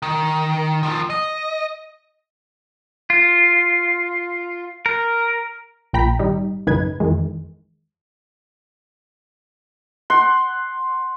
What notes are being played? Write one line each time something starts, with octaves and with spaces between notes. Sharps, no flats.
D#3
D#3 F3
D#5
F4
A#4
A#1 A#2 G5 A#5 B5 B6
G#1 G3 D#4
A1 F#2 C#3 D#4 B4 G#6
F2 D#3 E3 G#3
F#5 C6